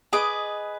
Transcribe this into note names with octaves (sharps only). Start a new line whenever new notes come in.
G#4 B4 D#5 D6